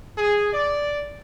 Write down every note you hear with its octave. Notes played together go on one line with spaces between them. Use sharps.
G#4
D5